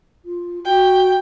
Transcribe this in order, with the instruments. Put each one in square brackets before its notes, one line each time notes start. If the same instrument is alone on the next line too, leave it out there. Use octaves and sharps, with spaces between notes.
[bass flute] F4
[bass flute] F#4 [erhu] G5